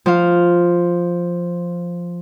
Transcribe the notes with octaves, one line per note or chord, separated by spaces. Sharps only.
F3 F5